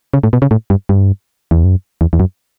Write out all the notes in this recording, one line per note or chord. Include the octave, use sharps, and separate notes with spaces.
C#3
A2
B2
C#3
A2
G2
G2
E2
F#2
E2
E2
F#2